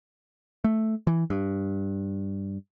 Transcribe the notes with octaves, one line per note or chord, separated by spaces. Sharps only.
A3
E3
G2